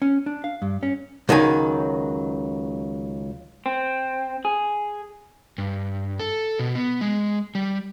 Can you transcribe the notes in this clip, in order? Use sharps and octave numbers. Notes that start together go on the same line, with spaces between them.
C#4
D4
F5
G2
C#4
C#2 D#3 F#3 G#5
C4
G#4
G2
A4
B2
B3
G#3
G3